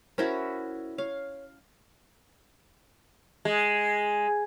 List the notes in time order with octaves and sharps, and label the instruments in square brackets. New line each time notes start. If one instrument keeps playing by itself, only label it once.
[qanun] C#4 E4 F#4 [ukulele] A#4 C5
[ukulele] C#5 [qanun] F5
[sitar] G#3